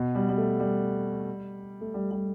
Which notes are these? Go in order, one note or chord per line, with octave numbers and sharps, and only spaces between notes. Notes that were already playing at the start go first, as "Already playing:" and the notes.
Already playing: B2
G3
G3
A3
G3
A3
G3
G3